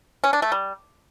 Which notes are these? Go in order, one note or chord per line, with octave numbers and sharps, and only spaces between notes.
C#4
D4
A3
G3